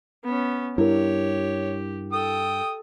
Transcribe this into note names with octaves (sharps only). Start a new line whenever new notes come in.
B3 C#4
G2 E4 G4 A#4 C#5
A4 G5 D#6